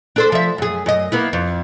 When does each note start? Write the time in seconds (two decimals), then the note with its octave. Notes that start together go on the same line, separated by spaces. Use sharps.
0.16 D4 A4 C5
0.32 F3 E5
0.58 F#2 G#4
0.86 F#2 D#5
1.12 A#3 B3 E4
1.33 F2